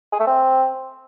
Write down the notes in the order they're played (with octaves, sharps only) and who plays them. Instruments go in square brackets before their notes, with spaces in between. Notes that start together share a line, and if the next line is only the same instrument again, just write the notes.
[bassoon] G#4
A3
C4